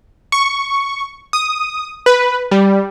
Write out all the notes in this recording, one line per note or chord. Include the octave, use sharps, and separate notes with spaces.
C#6
D#6
B4
G3